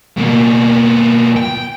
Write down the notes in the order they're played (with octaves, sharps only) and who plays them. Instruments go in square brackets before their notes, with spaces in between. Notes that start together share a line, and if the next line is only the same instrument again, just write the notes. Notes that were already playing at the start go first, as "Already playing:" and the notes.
[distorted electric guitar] B2 A#3
G5